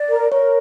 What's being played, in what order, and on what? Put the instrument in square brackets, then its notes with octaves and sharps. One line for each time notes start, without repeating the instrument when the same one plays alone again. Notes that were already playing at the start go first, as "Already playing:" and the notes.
Already playing: [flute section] D5
A#4
[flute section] A#4 [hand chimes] C#5